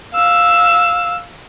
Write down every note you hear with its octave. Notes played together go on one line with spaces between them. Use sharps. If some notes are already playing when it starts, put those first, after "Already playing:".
F5 E6